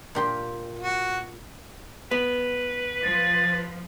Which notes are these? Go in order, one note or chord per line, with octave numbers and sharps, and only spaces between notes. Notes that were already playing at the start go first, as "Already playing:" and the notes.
A#2 G4 C6
F#4
B3 B4
F3 A6